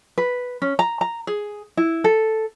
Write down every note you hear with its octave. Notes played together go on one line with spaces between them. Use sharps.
B4
C#4
A#5
A#5
G#4
E4
A4